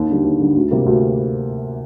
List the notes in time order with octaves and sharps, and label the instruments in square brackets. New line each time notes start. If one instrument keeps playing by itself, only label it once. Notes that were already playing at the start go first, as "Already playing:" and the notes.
Already playing: [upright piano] D#2
D3 G3
D#2
D3 G3
D2
C3 G3 A#3
D2